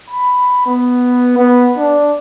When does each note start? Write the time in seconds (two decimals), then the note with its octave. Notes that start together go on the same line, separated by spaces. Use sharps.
0.10 B5
0.66 B3
1.37 B3
1.77 D4